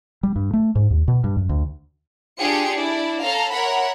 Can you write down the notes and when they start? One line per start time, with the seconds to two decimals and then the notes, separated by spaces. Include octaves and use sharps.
0.23 G3
0.36 G2
0.54 A3
0.75 G#2
0.91 D#2
1.08 B2
1.24 G2
1.37 F#2
1.49 D2
2.39 D4 F4 G4 G#4 G5 C#7
2.73 D4 E4 D5
3.22 C#4 A4 F5 A#5
3.52 A#4 C#5 E5 F#5 B5